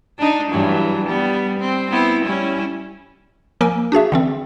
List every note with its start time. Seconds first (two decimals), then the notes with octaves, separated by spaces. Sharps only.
0.18 D4 D#4
0.51 G2 E3 F#3
1.04 G3 B3
1.59 C4
1.90 B3 C4 E4
2.25 G3 C#4 E4
3.61 F3 A#3 A#4 G#5 E6 D7
3.92 D4 F#4 G#4 E5
4.12 D3 E3 C4